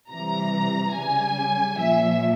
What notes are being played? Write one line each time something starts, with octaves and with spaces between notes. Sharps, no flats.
C3 E3 G3 A#5
C#3 G3 G#5
A#2 F3 E5